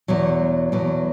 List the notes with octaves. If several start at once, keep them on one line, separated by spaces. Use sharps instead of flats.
E2 B2 F#3
E2 B2 F#3